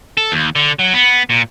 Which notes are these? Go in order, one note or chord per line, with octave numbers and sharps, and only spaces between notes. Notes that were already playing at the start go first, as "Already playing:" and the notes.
A4
D#2
D3
F#3
B3
A#2